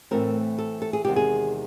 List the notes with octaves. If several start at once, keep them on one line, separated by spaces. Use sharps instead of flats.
A2 E3 A3 C4 A#4
A4
A4
G#4
E2 C3 D#3 G#3 G4
G#4